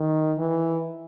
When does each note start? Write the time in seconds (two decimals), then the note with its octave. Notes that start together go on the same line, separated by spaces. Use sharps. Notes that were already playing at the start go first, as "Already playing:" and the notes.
Already playing: D#3
0.39 E3